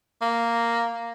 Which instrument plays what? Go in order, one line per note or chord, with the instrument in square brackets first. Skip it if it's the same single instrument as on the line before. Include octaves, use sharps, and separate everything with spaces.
[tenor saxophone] A#3